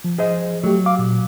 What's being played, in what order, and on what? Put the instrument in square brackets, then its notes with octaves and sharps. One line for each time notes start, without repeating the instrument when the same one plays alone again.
[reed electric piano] F3
[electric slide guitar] G#4 C5 D#5
[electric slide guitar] F#3 [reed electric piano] A3 G4
[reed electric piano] F5 D6
A#2